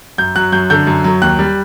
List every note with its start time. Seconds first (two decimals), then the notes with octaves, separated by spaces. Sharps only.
0.18 F#2 G6
0.35 F#3 F#6
0.52 F#2 G6
0.70 D3 G6
0.87 F#2
1.04 F#3
1.22 D#2 F#6
1.39 G3